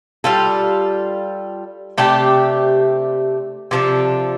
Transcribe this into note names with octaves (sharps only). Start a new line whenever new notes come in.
G3 F4 A4
C3 A3 D4 G4
C3 F3 D4 A4